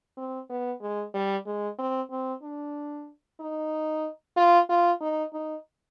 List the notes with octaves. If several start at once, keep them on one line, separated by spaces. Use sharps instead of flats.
C4
B3
G#3
G3
G#3
C4
C4
D4
D#4
F4
F4
D#4
D#4